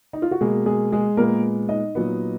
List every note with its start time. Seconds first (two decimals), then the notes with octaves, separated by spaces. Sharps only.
0.13 D#4
0.22 F4
0.31 F#4
0.41 B2 G#3 A#3 G#4
0.66 G#3 G#4
0.92 G#3 G#4
1.17 A#2 G#3 A#3 B3 A#4
1.69 D#4 D#5
1.95 A#2 F#3 B3